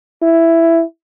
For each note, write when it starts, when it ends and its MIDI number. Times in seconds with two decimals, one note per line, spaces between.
0.22 0.83 64